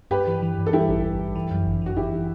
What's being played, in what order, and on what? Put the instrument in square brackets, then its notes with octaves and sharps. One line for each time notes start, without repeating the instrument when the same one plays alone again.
[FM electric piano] G2 [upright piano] G4 B4
[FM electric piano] E3
E3
G2
[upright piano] A4
[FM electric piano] G3 [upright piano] E4 G4
[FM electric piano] A1
A1
A1
E3
F#2
G1
[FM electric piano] E3 [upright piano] F#4
[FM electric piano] G1 [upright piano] E4 G4